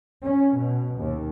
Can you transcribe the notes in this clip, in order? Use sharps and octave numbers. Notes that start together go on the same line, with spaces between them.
C#4
B2
D#2